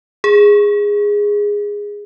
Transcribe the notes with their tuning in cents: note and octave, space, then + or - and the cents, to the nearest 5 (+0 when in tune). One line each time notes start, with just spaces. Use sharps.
G#4 -10